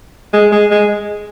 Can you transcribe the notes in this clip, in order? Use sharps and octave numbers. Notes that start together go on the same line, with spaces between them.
G#3
G#3
G#3